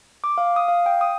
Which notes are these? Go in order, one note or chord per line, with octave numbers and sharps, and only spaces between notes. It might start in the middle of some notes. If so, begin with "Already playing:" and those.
D6
F5
D#6
F5
G5
D#6